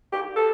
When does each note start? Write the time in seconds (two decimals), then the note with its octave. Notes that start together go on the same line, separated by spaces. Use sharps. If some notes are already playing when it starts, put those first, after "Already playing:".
0.13 G4
0.36 A4